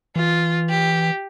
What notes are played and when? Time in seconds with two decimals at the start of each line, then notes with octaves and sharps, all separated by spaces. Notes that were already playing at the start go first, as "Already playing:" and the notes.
0.16 E3 F4
0.69 G4